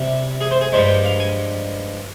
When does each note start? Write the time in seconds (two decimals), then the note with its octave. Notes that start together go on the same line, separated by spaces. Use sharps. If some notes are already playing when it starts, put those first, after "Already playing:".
Already playing: C3 G3
0.41 G#4
0.51 C5
0.61 G#4
0.72 G2 F3 G#3 C5
0.88 G5
1.05 F5
1.20 G#5